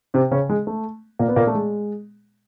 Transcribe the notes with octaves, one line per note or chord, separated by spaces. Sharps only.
C3 C4
C#3 C#4
G#3
A3
A#2 A#3
B3
A#2 A#3
A3
G#3